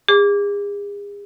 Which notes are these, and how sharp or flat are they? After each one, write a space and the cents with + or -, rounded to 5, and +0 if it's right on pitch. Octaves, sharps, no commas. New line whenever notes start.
G#4 -40 D6 -15